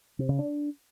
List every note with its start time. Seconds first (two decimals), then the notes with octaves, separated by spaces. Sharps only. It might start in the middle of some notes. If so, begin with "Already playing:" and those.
0.19 C3
0.29 C#3
0.39 D4